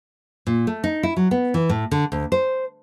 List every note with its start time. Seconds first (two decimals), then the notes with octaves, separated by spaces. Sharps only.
0.47 A#2
0.67 A3
0.84 D#4
1.03 E4
1.17 F#3
1.31 B3
1.54 E3
1.69 A2
1.91 D3
2.12 D2
2.32 C5